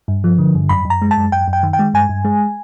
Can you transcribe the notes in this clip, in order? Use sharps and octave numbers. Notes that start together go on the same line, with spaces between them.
G2
F3
D3
G2
F#2 B5
F#2
A#5
G#3
A5
F#2
F#2 G5
F#2
G5
D#3
G5
G#3
G2 G#5
G2
G#3